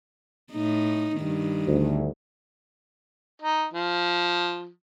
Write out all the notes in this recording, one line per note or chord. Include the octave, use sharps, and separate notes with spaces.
A2 D#4
G2 D#3
D2
D#4
F3